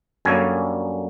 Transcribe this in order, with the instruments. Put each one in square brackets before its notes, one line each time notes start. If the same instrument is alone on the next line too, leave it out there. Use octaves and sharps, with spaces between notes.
[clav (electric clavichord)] F#2 D3 G3 A#3 C#4 G#5